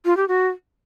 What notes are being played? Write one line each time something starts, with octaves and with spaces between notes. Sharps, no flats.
F4
G4
F#4